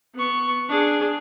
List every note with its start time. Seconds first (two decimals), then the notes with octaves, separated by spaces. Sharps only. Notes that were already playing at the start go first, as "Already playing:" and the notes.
0.14 B3 C#6
0.68 D4 G#4